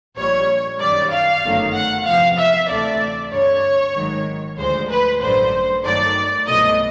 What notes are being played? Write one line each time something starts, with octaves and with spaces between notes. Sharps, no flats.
A#1 A#2 G3 C#5
F#2 D#3 G3 D5
F5
G1 F#2 D#3 F#3 A3
F#5
E2 C3 F3 F5
E5
D2 C3 E3 A3 D5
G2 D3 G3 C#5
G#1 G#2 D#3 F#3
D2 D3 F3 G#3 C5
B4
A1 G2 D3 F#3 C5
G2 D#3 F#3 A3 D5
C2 B2 F#3 A3 D#5